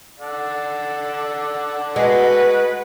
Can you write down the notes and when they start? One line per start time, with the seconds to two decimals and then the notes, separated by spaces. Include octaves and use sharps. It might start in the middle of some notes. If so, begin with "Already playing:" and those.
0.19 A4 D5 F#5
1.96 G#3 F#4 B4